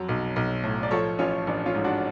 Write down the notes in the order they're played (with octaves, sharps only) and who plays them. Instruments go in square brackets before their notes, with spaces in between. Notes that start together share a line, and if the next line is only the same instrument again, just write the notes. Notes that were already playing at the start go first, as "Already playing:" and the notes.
Already playing: [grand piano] F2 F#3
B1
B1
A2
D5
F3 A4 C#5
A1 C#4 F4
A1 D4
C#4 F4
G#2
D4 F#4